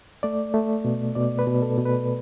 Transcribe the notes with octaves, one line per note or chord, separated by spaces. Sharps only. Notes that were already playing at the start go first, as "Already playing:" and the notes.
A3 D5
A3
B2
B2 D5
B4
B2
A4
B2
B4